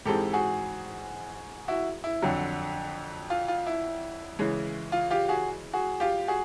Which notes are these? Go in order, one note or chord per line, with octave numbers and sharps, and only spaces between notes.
G#2 E3 G#3 C4 G4 A4
F#4 G#4
E4 F#4
E4
F2 D3 F#3
F4
F4
E4
C#3 E3 G#3
F4
F4 G4
F#4 G#4
F#4 G#4
F4 G4
F#4 G#4